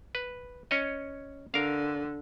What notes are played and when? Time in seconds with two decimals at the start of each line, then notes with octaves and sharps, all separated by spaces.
0.15 B4
0.71 C#4 C#5 D#5
1.54 D3 A#4 F5